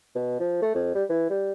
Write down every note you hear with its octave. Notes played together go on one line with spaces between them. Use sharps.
B2
F3
A3
F2
G3
E3
G3